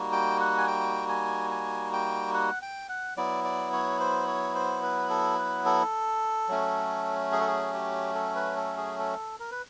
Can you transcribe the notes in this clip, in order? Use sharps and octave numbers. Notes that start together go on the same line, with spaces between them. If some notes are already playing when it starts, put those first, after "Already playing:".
Already playing: G3 A#3 D#4 F#4
G5
F#5
G#5
G5
G#5
G#5
G5
F#5
G5
F#5
F#3 B3 E4 D5
D5
C#5
C5
C#5
C5
B4
A4
B4
A4
F#3 A3 C#4
G#4
A4
G#4
G4
A4
B4
A4
G#4
A4
A#4
B4